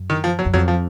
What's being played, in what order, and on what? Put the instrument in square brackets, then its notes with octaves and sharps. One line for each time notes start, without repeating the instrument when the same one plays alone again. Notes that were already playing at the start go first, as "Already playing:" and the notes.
Already playing: [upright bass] F#2
[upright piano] D#3
F3
F#3
[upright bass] F#2
[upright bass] F2 [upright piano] F#3
[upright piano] F3